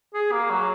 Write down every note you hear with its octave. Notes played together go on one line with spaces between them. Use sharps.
G#4
A#3
F#3